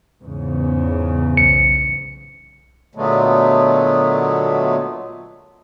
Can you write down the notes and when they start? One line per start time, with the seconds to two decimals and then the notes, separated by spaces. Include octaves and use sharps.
0.22 E2 G#2 C#3
1.37 B1 C#7
2.95 A#2 D3 F#3 G#3 A3 B3